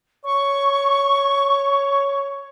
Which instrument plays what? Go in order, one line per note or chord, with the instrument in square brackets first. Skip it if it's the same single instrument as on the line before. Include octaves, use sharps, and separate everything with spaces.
[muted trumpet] C#5 [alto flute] C#6